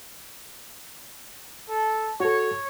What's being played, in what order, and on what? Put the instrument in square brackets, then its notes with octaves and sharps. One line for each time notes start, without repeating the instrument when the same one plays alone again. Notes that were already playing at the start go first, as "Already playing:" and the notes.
[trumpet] A4
[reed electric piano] F#4 A4 [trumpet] C#5